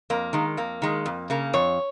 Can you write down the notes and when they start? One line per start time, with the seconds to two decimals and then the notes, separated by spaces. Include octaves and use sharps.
0.10 F2 A#3
0.33 D#3 G#3
0.57 F2 A#3
0.82 D#3 G#3
1.06 F2
1.30 C#3 A#3
1.53 F2 C#5